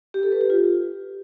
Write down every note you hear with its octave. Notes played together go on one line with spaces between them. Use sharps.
G4
A4
B4
G4
F4